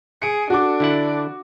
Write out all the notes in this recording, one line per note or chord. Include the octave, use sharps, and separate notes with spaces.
G#4 C#7 D7
D4 F#4 A4 D5 D6
D3 E4 F#5